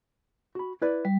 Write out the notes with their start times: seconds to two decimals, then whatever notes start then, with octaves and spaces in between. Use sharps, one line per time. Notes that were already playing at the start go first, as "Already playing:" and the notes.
0.55 F#4 B5
0.82 E4 B4 D5
1.05 G3